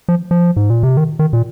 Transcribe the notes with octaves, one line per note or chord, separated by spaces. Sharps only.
F3
F3
G#2
A#2
C3
D#3
D#3
A#2